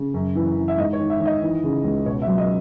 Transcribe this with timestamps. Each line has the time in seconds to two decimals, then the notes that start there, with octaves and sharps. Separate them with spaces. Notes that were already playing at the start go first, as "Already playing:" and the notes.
Already playing: C#3
0.14 F#2
0.35 E3
0.57 E3
0.68 E5
0.77 G#2 D#5
0.93 C#5
1.00 D#3
1.10 E5
1.20 D#3
1.25 D#5
1.41 E3
1.64 C#3
1.85 C#2
2.06 B2 C#5
2.22 E5
2.27 F#3
2.38 D#5